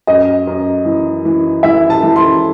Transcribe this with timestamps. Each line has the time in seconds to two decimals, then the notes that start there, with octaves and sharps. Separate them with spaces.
0.07 F#2 D#5
0.47 F#2
0.85 E3
1.25 E3
1.63 E3 E5
1.90 A5
2.03 E3
2.16 C6